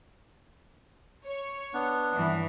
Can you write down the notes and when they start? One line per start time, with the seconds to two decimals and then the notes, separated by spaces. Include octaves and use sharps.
1.24 C#5
1.74 B3 D4
2.15 G2 E3